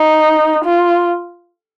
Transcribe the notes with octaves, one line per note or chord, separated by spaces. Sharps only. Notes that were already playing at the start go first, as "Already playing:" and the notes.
Already playing: D#4
F4